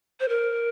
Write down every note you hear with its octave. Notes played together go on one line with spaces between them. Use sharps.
C5
A#4